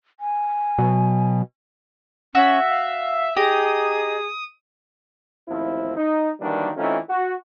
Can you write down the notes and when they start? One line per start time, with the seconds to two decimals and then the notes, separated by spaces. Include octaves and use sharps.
0.20 G#5
0.79 B2 F#3
2.35 C#4 F#4 E5
2.69 F5
3.37 D#4 G4 G#4 D#6
5.49 A1 D#2 F3 C4 E4
5.97 D#4
6.40 D#3 E3 F#3 G3 A#3 D4
6.77 E3 A3 C4 C#4 D#4 F4
7.09 F#4